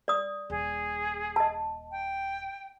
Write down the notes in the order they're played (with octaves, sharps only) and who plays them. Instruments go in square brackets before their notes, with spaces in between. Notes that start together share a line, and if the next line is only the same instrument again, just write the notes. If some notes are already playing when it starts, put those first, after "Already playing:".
[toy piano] D5 D#6
[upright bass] D#1 [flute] G#4
[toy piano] D#5 A5
[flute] G5